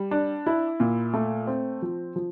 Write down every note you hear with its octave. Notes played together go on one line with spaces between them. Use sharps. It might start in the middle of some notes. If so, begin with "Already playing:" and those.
Already playing: G3
D4
E4
A#2
A3
C4
F3
F3